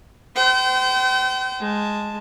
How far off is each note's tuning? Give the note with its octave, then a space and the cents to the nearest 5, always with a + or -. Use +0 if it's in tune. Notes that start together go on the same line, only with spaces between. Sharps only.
C5 -30 G5 -40
G#3 +0 A5 +0